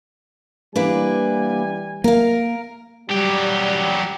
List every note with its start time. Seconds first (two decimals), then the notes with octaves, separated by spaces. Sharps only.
0.76 E3 G3 A#3 D4 B4 G#5
2.04 A#3 A#4 F5
3.10 F#3 G3 G4